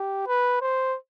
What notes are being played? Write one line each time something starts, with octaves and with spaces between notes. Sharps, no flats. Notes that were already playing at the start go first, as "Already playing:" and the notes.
Already playing: G4
B4
C5